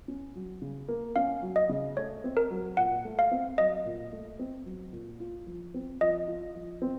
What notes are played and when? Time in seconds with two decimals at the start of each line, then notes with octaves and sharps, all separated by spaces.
0.08 C#4
0.35 F#3
0.62 C#3
0.88 A#3
1.16 C#4 F5
1.42 F#3
1.56 D#5
1.69 C#3
1.97 A3 C#5
2.24 C4
2.37 A#4
2.50 F#3
2.77 A#2 F#5
3.05 A3
3.19 F5
3.31 C4
3.58 F#3 D#5
3.85 A#2
4.13 A3
4.39 C4
4.66 F#3
4.93 A#2
5.20 F4
5.47 F3
5.74 C4
6.01 F3 D#5
6.28 F4
6.55 F3
6.82 C4